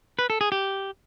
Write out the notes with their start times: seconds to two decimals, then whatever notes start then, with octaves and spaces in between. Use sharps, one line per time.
0.19 B4
0.30 A4
0.41 G#4
0.52 G4